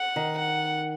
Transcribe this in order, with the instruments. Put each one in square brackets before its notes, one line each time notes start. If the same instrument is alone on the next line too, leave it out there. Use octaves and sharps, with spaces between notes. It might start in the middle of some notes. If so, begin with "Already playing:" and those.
Already playing: [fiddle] F#5
[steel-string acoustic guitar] D#3
[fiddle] F#5